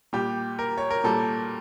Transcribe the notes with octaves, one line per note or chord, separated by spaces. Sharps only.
A#2 G3 G4
A#4
C#5
A#4
A#2 G3 A4